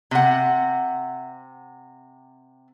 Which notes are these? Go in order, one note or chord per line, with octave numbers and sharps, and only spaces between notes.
C3 F#5